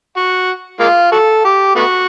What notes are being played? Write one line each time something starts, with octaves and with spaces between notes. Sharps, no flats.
F#4
G#3 A#3 F4
F#4 A4
G4
A3 B3 F#4